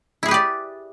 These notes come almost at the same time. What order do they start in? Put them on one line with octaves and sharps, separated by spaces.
E4 G#4 B4 G4 D5